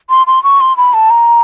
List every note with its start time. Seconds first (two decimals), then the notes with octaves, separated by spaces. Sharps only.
0.10 C6
0.27 C6
0.44 C#6
0.61 C6
0.77 B5
0.94 A5
1.10 A#5